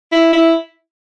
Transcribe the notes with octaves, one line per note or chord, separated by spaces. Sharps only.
E4
E4